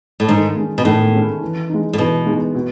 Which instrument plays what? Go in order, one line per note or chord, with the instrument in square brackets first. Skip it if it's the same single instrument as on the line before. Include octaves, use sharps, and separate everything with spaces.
[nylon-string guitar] A2
[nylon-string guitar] G#2 [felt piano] D#3
[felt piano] G#3 C#4
[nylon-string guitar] B2
[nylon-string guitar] A2 [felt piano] D#3
[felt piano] G#3 C#4
E3
G#3 D#4
[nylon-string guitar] A2
[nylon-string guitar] B2 [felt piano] E3
[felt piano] G#3 D#4
B2